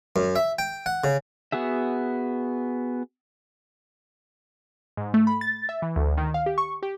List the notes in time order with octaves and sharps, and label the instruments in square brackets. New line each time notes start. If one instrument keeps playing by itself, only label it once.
[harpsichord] F#2
E5
G5
F#5
C#3
[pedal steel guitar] B3 F#4 G#4 E5
[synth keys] G#2
A3
B5
A6
E5
E3
D2
D#3
F5
G4
C#6
G4